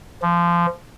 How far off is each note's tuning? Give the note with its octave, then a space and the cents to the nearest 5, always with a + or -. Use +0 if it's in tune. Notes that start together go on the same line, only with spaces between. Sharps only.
F3 -20